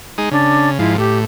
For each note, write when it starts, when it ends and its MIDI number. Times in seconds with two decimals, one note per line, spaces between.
0.18 0.29 56
0.18 0.29 63
0.31 0.78 49
0.31 0.68 62
0.79 0.97 44
0.79 0.97 53
0.79 0.93 64
0.98 1.25 45
0.98 1.18 67